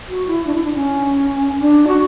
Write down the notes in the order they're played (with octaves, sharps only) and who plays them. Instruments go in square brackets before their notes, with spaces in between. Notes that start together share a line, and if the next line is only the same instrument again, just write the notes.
[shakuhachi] F#4
E4
D4
E4
D4
C#4
D4
F#4